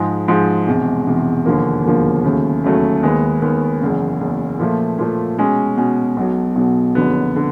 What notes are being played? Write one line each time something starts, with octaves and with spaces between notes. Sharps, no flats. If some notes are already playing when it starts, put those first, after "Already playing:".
Already playing: G#2 F3 G#3
G#2 F3 G#3
E1 E2 C3
E1 E2 C3
E1 D#2 D3 F3 A#3
E1 D#2 D3 F3 A#3
D#2 C#3 F#3 A3
D#2 C#3 F#3 A3
D#2 D#3 G#3 B3
D#2 D#3 G#3 B3
F#1 E2 C#3
F#1 E2 C#3
A#2 F3 A3
A#2 F3 A3
B2 G#3 C#4
B2 G#3 C#4
B1 B2 F#3
B1 B2 F#3
F#1 F2 D3 F#3 B3
D3